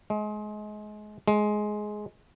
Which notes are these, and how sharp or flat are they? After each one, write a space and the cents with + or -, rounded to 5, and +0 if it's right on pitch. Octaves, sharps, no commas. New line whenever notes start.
G#3 +30
G#3 +15